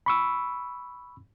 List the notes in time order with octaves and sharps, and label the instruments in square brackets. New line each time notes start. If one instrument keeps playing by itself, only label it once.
[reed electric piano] B5 C#6 E6